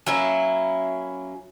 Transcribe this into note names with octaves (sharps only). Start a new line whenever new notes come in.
F#3 A#3 C#4 E4